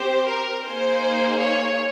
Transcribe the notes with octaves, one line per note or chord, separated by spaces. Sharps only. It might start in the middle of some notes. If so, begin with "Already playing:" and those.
Already playing: C4 G4 C5
A#4
A#3 D#4 G#4 C5
C#5